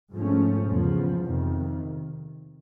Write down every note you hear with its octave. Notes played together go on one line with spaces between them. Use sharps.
G#2 F3 A3 C#4
E2 C#3 F3
F2 C3 D#3